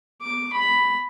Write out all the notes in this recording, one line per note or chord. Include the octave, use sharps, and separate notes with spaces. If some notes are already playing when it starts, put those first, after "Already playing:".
D6
B5